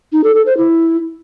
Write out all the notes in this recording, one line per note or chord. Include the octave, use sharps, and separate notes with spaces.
D#4
A4
A4
C5
E4